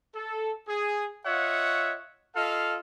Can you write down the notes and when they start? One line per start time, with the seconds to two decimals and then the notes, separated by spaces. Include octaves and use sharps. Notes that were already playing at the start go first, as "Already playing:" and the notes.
0.15 A4
0.68 G#4
1.25 F4 C#5 D#5 E5 F#5
2.35 F4 A4 D#5 F5